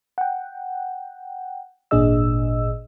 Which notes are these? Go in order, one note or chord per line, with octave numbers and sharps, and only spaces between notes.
F#5 G5
G#1 A#2 D4 G#4 D#5 E6